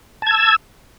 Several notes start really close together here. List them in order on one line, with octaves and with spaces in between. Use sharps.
A5 G#6 E6